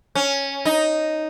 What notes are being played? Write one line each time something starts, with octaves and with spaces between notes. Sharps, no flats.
C#4
D#4